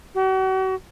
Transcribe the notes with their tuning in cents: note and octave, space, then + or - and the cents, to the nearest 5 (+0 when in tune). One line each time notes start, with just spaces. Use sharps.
F#4 +40